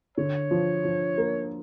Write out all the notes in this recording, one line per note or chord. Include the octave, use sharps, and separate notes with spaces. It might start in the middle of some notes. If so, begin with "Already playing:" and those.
D3 C#5
F3
F3
A#3